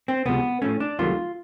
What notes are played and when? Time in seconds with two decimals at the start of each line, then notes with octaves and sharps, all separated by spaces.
0.08 C4
0.25 C#2 C3 F3 G#3 B3
0.62 A2 F3 A3 C#4
0.80 D4
0.99 C2 C3 D#3 F#3 A3 F4